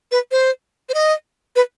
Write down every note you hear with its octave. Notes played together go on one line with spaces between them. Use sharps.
B4
C5
C5
D#5
B4